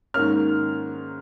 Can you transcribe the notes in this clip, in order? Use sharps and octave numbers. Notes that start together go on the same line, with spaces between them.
G#2 D#3 A#3 C#4 F6